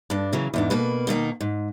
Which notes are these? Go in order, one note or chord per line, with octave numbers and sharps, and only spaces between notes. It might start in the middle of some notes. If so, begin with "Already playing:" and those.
G2 D4
C#3 E3 F#3
E2 G#2 D4
B2 A#3 B4
B2 D#3 A#3 D#4
G#2